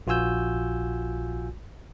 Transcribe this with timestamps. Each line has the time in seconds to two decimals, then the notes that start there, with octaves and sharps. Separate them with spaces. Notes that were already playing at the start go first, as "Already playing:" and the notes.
0.07 A#1 F4 F#4 G#5 E6 G6